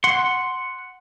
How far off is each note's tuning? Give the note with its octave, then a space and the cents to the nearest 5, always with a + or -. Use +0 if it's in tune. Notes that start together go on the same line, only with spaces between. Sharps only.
F#5 +0 C6 +0